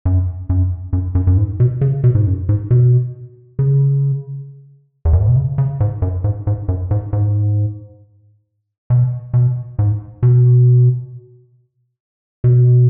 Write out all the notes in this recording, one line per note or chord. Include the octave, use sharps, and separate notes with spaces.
F#2
F#2
F#2
F#2
F#2
G#2
B2
C#3
B2
G#2
F#2
G#2
B2
C#3
E2
F#2
G#2
B2
C#3
C#3
G#2
F#2
G#2
G#2
F#2
G#2
G#2
B2
B2
G#2
B2
B2